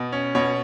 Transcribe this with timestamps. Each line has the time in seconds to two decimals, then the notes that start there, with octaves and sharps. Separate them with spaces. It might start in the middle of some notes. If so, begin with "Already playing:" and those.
Already playing: B2
0.12 C#4
0.35 B2 C#5